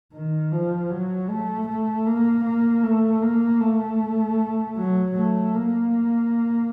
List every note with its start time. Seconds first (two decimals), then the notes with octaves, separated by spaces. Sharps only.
0.14 D#3
0.52 F3
0.91 F#3
1.30 A3
1.68 A3
2.06 A#3
2.45 A#3
2.84 A3
3.22 A#3
3.61 A3
4.77 F#3
5.15 A3
5.55 A#3